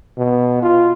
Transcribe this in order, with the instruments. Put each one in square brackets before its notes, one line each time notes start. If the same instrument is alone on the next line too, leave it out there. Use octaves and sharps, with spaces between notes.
[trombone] B2
F4